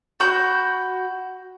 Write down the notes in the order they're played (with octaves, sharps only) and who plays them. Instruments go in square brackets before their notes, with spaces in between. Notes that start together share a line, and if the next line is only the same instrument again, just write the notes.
[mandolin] F#4 B5 G6